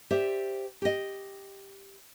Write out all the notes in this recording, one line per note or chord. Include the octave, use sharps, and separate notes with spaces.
G4 C5 D5 E5
G4 D#5